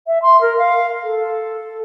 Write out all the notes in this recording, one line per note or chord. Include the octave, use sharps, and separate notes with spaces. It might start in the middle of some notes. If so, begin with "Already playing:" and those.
E5
C6
A#4
F5
A4